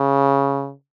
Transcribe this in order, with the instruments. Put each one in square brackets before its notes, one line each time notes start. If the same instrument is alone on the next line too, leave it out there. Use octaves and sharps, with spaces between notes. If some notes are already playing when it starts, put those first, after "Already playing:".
Already playing: [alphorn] C#3